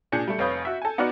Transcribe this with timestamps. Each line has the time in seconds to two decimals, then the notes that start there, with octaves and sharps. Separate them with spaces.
0.12 A#2 D4 G#4 G6 C#7
0.27 G3 A3
0.39 F1 B4 C#5 F5 D#6 G6
0.65 F#4 E5
0.82 A4 G#5
0.98 B3 D#4 F#4 D5 F6 C#7